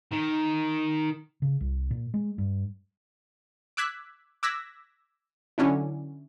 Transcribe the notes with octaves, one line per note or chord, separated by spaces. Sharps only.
D#3 A#4
C#3
C2
A#2
G#3
G2
D6 E6 F#6 G#6 B6
D6 E6 F#6 G#6 A#6 B6
D3 F#3 C#4 D4 E4